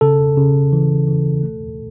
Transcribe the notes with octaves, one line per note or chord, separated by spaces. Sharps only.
C#3 A4
C#3
E3
E3
A3